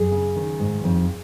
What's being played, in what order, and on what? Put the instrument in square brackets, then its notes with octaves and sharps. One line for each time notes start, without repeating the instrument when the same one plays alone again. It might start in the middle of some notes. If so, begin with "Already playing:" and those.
Already playing: [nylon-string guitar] F#2 G#4
C#3
D#3
G#2
F2